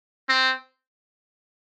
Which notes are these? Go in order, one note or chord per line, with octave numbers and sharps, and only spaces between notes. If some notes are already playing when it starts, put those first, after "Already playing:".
C4